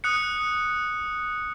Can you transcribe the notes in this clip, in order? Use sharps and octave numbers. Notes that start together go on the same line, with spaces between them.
D#6 F#6 C#7